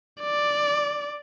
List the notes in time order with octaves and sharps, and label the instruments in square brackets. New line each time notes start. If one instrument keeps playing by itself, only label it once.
[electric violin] D5